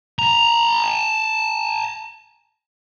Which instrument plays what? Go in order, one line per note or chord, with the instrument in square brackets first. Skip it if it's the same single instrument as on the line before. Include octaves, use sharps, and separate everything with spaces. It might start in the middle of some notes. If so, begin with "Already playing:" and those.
[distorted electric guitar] A5 A#5